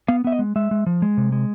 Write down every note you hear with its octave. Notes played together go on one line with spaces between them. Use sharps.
B3 F5
B3 E5
D#5
G#3
G#3 E5
G#3
F3
G#3
C3
G#3